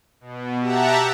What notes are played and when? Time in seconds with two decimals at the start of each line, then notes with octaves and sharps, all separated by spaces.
0.21 B2
0.61 G4 E5 F#5 A5 A#5